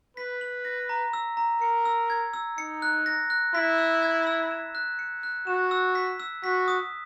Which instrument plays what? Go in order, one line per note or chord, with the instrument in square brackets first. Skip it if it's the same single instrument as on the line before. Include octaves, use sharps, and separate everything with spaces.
[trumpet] B4 [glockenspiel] B6
[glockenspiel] F#7
A#6
A#5
E6
A#5
[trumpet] A#4 [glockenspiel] C#7
[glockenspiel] E6
G#6
E6
[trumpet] D#4 [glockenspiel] C#7
[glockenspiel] F#6
A#6
F#6
[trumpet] E4 [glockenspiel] B6
[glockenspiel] E6
G#6
E6
E7
F#6
C#7
F#6
[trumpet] F#4 [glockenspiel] E7
[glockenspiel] E6
B6
E6
[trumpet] F#4 [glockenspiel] B6
[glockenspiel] D#6